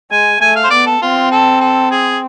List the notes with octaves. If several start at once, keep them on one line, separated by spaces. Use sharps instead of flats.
G#3 G#5
A3 G#5
F5
C5
B3 D5
A4
C4 F4
A4
A4
G#4